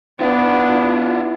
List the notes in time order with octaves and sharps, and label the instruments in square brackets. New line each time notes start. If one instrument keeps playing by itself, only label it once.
[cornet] B3 [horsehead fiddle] D4 [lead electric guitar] E4 F4